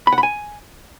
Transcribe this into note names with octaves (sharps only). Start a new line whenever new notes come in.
B5
F#5
B5
G#5